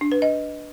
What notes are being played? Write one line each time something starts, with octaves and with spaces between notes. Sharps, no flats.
D4
B4
D#5